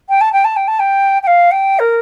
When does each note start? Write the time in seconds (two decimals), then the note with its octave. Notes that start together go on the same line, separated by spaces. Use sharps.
0.09 G5
0.21 A5
0.32 G5
0.44 A5
0.56 G5
0.67 A5
0.79 G5
1.22 G5
1.27 F5
1.51 G5
1.79 A#4